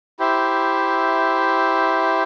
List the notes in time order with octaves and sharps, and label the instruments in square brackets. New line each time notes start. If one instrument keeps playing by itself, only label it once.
[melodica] E4 G4 C5 E5